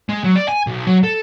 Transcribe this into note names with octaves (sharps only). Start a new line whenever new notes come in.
G#3
F#3
D5
G#5
B1
F#3
A4